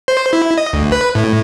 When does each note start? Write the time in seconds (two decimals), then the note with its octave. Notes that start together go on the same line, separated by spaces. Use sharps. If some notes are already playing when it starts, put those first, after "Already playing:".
0.08 C5
0.33 E4
0.58 D#5
0.73 D2
0.92 B4
1.15 A2